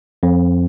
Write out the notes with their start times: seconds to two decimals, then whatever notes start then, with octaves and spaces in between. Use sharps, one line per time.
0.23 F2